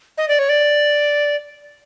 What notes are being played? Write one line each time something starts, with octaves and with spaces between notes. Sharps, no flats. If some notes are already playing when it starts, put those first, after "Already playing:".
D#5
D5
C#5
D5